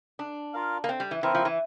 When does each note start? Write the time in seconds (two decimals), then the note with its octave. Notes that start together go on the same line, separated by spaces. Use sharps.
0.19 D4
0.54 F4 A#4 F5
0.84 A#3
0.89 C4
1.00 G3
1.11 E3
1.23 E3 C4 E4 A#4
1.35 F3
1.45 E3